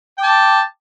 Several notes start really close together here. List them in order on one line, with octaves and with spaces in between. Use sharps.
G5 D6 A5